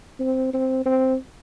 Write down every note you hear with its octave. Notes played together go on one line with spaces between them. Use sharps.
C4
C4
C4